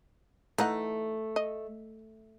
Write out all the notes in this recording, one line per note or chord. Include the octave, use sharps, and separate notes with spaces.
E3 A3 D#4 F#5
D#5